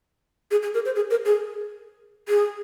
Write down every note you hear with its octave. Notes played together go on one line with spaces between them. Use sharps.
G#4
G#4
A#4
C5
G#4
A#4
G#4
G#4